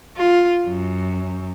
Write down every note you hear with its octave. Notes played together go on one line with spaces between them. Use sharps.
F4
F#2